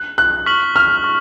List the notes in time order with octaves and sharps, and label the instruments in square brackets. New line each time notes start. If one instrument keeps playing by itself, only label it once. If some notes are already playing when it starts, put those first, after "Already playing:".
Already playing: [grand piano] F#6
F#6
[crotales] C#6 F6 B6 F#7
[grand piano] F6
[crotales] C#6